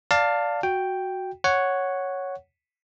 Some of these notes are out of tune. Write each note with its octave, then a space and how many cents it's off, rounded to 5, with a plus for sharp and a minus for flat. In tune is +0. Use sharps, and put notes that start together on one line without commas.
D5 -10 F5 +10 A5 +20
F#4 +0 G5 +0
C#5 +0 F#5 +0